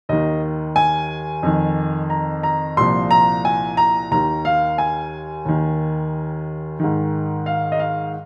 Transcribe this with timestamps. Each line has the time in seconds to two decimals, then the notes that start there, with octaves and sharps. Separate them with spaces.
0.09 D#2 D#3 D#5
0.76 G#5
1.43 F2 D#3
2.10 A#5
2.43 A#5
2.77 C2 A#2 F3 C6
3.11 A#5
3.45 G#5
3.77 A#5
4.11 D#2 D#3 A#5
4.45 F5
4.78 G#5
5.45 D#2 D#3
6.80 G#2 D#3
7.46 F5
7.72 D#5
7.79 F5